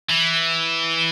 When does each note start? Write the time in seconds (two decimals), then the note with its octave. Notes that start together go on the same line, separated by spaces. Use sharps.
0.10 E3